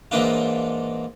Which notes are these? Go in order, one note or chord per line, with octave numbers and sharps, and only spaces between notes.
G#2 E3 A#3 D4 F4